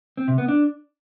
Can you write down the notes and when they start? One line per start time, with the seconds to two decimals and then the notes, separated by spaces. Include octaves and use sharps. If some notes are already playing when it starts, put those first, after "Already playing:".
0.17 C4
0.28 C3
0.38 B3
0.48 D4